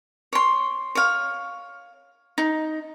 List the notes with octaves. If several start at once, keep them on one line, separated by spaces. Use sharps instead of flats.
C#5 C6
C#5 F5
D#4